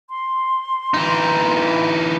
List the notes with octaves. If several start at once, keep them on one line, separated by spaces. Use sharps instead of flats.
C6
E3 D#4